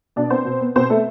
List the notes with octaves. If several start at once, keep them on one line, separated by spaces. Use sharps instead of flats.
B2 D4 D5
B3 C4 C5
B2
B3
B2 C4 C5
A3 B3 A4